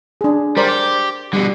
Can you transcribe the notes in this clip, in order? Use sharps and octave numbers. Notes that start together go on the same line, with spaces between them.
D4 G#4
G3 A#4 C5 D5
G4
B2 D3 G3